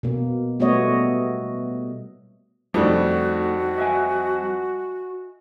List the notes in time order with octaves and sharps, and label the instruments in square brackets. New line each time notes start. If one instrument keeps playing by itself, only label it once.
[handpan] B2 A#3
G3 A3 B3 F#4 C#5 D#5
[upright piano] F2 D4 [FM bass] G3 [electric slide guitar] A3 D#4 A4 [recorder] F#4
[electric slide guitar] D#5 E5 G#5